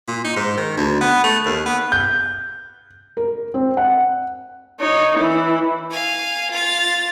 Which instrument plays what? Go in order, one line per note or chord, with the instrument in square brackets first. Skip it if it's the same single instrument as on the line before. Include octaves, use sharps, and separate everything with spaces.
[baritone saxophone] A#2
D#4
G#2
D#3
D2
B3
A3
D#2
B3
[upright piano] G6
[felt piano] A#4
C4
F#5
[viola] D#4 C#5
E3 E4
[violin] F5 G#5
F4 A6